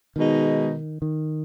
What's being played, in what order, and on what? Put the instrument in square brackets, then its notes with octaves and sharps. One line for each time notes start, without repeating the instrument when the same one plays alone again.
[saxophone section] B2 G#3 D#4 [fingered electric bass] D#3
[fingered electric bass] D#3